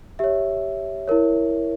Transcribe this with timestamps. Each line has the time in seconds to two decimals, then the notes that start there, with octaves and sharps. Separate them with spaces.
0.19 G4 C#5 E5
1.08 E4 A#4 C#5